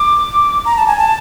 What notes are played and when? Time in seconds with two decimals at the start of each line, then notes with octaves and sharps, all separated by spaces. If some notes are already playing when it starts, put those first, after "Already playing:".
Already playing: D6
0.65 A#5
0.77 A5
0.87 G#5
0.99 A5